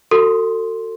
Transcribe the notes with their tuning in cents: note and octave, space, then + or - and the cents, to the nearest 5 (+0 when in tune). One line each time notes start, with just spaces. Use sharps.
F#4 +0 A4 +35 C6 +0